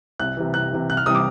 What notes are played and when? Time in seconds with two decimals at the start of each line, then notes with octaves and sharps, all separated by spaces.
0.19 C2 F#6
0.37 C3 E3
0.54 C2 F#6
0.72 C3 E3
0.89 C2 F#6
0.97 F6
1.06 C3 E3 G3 D#6
1.15 D6